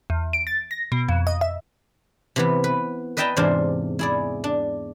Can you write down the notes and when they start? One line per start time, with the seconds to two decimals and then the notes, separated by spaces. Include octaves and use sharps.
0.10 E2
0.33 D7
0.47 A6
0.71 A#6
0.92 B2
1.09 F2
1.27 D#5
1.41 E5
2.36 C3 E3 B3
2.64 B4
3.17 B4 D#5 E5 G5 A5 A#5
3.37 E2 G#2 C3 D4 C5 F5
3.99 E4 G#4 D5
4.44 D4